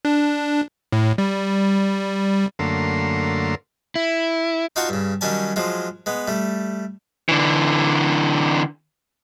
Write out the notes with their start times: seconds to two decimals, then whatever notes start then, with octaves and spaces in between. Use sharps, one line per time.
0.05 D4
0.92 A2
1.18 G3
2.59 F#2 D3 A3 A#3 C6
3.96 E4
4.76 D#4 F4 F#4 F#5 A5 C#6
4.89 G2 C#3
5.21 D#3 F#3 G3 C#4 G#5 A5
5.56 F3 F#3 G#3 F4
6.06 G#3 B3
6.28 G3 A3
7.29 D3 E3